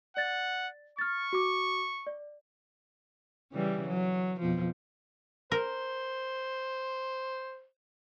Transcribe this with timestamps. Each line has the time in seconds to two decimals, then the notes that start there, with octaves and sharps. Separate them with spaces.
0.17 D5 F#5 A6
0.99 C#6 F6 A6
1.33 F#4 D6
2.07 D5
3.52 C#3 E3 G3
3.89 F#3
4.40 F2 B2 F3
5.52 A#4 C5